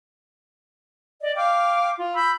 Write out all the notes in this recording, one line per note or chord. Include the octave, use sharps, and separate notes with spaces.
D5 D#5
F5 G5 D6 F6
F4
B5 E6 G6